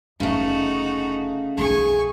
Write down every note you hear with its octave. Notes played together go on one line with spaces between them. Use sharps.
F1 C#3 A3 B3 D#4 F#4
B1 D#4 G#4 G#5 C#6